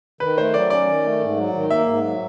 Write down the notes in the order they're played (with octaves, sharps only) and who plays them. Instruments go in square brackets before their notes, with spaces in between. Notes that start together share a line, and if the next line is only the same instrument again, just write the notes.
[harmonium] D#3 [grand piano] B4
[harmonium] A3 [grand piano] C5
[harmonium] F#3 [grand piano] D5
[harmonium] C#4 [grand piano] D5
[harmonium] D#3
A3
G#2
F#3
D#3
[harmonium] A#3 [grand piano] E5
[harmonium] G#2
F#3